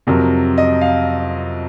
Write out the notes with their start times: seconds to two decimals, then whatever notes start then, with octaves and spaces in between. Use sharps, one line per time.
0.07 F2 C3 F#3 A#4
0.58 D#5
0.81 F5